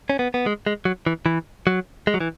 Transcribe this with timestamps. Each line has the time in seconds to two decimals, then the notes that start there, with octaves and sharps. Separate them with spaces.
0.10 C#4
0.19 B3
0.34 B3
0.46 G#3
0.66 G#3
0.85 F#3
1.07 E3
1.26 E3
1.67 F#3
2.07 G#3
2.14 F#3
2.21 E3